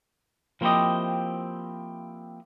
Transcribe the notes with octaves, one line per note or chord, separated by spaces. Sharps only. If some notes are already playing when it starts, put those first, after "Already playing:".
F3 A#3 C4 E4 G4 D#5